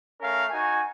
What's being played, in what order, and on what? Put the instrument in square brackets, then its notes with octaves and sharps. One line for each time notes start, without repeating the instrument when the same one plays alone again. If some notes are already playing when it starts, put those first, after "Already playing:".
[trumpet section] A3 C#4 A#4 F5
D#4 F#4 G#5